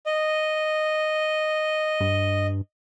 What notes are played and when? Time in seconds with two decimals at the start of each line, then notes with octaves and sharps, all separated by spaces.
0.06 D#5
2.00 G2